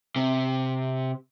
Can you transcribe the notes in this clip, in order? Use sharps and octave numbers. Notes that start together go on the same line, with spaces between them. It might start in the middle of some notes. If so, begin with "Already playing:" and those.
C3